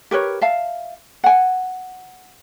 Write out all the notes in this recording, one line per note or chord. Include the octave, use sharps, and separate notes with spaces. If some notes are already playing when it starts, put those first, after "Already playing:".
G4 A#4 B4 C#5
E5 F5 A5
F#5 G#5